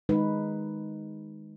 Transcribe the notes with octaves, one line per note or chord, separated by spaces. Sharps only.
D#3 G#3 D#4 B4